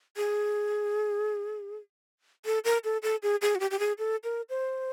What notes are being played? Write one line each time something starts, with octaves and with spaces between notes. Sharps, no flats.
G#4
A4
A#4
A4
A4
G#4
G#4
F#4
G4
G4
G#4
A4
A#4
C5